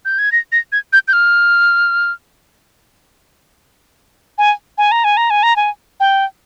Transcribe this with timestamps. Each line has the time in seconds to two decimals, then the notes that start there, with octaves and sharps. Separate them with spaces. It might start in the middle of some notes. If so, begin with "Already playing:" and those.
0.05 G6
0.19 G#6
0.32 A#6
0.52 A#6
0.72 G#6
0.93 G6
1.08 G6
1.13 F6
4.38 G#5
4.78 G#5
4.92 A#5
5.04 G#5
5.17 A#5
5.30 G#5
5.43 A#5
5.56 G#5
6.00 G5